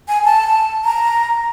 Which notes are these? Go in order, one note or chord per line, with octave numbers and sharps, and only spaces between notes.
G#5
A5
A#5